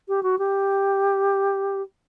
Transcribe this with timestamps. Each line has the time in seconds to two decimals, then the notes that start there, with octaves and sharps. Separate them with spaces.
0.08 G4
0.23 F#4
0.38 G4